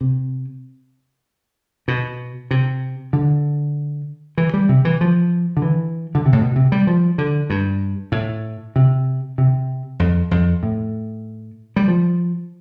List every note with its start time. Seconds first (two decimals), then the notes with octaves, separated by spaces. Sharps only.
0.01 C3
1.88 B2
2.51 C3
3.13 D3
4.38 E3
4.54 G3
4.69 C3
4.85 E3
5.01 F3
5.57 D3
5.62 E3
6.15 D3
6.26 C3
6.33 A2
6.41 B2
6.56 C3
6.72 G3
6.87 F3
7.18 D3
7.50 G2
8.12 A2
8.76 C3
9.38 C3
9.99 F2
10.31 F2
10.63 A2
11.76 G3
11.88 F3